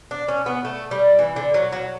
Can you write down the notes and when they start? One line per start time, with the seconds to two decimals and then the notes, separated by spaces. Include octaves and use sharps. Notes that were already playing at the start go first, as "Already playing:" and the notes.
0.11 D4
0.28 C#4
0.46 B3
0.65 A3
0.91 G3
1.19 E3
1.36 D3
1.54 F#3
1.72 F#3